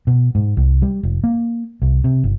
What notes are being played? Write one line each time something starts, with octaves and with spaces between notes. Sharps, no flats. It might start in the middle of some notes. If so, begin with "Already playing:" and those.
B2
G#2
C2
G3
F1
A#3
C2
C3
G1